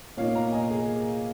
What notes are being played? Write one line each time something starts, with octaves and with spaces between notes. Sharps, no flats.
A#2 A#3 D#4 C#5 F5
F5 A#5
D#5 G#5
A#4
G#4